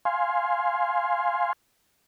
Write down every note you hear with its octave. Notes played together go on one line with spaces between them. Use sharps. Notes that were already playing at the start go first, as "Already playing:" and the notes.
F5 G#5 C6